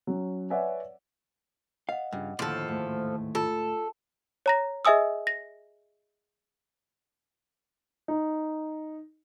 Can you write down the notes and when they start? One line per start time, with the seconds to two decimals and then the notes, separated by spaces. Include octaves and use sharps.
0.07 F#3 C#4
0.50 B4 C#5 D5 E5 F#5 G#5
1.89 D#5 F5 F#5
2.12 G2 C#3 F4
2.39 D#2 A2 D3 F3 A4
2.66 D2 G#2 A3
3.35 F4 A4 A5
4.46 C#5 A#5 A#6
4.85 G#4 D#5 E5 G#5 D#6 E6
5.27 A#6
8.08 D#4